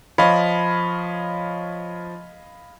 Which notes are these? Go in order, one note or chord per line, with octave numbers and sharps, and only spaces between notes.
F3 C#5 D#5 F5 B5